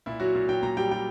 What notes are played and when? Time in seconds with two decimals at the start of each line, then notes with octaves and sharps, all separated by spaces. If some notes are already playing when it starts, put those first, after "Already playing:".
0.06 A#2 E4
0.20 F#3 F#4
0.35 A#2
0.49 F#3 G5
0.62 A#2 A#5
0.77 G3 G5
0.91 G3 G5